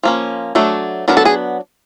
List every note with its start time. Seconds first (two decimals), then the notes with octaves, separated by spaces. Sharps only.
0.03 F3 A#3 C#4
0.55 F#3 A3 D4
1.08 F#3 B3 D4 A#4
1.17 A4
1.25 G#4